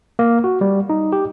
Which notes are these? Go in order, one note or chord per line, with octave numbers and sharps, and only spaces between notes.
A#3
F#4
G3
D#4
G4